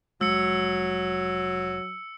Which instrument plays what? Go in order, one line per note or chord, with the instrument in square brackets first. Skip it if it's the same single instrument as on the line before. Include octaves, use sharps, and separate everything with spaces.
[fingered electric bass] F1 G#3 [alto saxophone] F#3 [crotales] E6 C#7